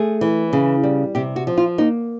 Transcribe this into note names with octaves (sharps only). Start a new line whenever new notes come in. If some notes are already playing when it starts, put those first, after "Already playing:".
Already playing: A3 G#4
E3
C#3
G3
C3 G4
F#4
F3
F4
A#3 D#4